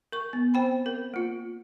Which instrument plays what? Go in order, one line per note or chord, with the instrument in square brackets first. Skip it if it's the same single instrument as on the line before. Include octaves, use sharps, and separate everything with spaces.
[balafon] A#4 C#6
B3
C4 C5 G5 B5
A#4
A#3 F4